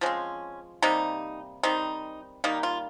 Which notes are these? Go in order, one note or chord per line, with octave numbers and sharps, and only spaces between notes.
F3 G#3 C4 C#4
C3 G3 A#3 D#4
D#3 G3 C4 D#4
D#3 G3 A#3 D#4
F4